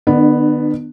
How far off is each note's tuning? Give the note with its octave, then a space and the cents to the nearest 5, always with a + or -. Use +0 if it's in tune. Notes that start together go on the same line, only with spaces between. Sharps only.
D#3 -45 B3 +0 D4 +25